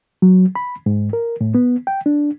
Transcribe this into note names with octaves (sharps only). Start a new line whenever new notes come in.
F#3
B5
G#2
A#4
A2
B3
G5
D4